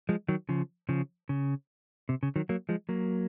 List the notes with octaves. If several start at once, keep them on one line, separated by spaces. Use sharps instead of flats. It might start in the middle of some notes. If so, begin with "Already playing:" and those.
F3 G#3
D#3 F#3
C#3 F3
C#3 F3
C#3
C3
C#3
D#3 F#3
F#3 A#3
F3 G#3
F#3 A#3